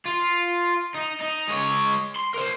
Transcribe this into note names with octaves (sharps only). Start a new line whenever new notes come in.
F4
D#4
D#4
G#3 C#5
C6
A#4 C5